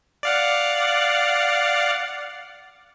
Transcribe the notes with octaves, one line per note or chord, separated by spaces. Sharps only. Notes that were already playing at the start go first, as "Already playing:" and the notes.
D5 F5 F#5